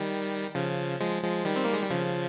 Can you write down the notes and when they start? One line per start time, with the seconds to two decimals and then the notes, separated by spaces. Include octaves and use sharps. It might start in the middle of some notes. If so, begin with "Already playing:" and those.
Already playing: D#3 G3
0.55 C#3 F3
1.00 F3 G#3
1.23 F3 G#3
1.45 D#3 G3
1.56 C4
1.65 A#3
1.73 G#3
1.82 G3
1.91 C#3 F3